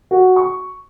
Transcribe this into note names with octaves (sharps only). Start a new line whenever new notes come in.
F#4
C#6